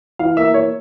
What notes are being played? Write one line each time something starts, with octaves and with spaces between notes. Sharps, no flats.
E3 F5
A#3 E5
A#3 C#5